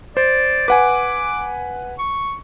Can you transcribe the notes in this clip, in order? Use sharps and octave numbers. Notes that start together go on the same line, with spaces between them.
C5 D5
B4 F#5 G#5 D6
C#6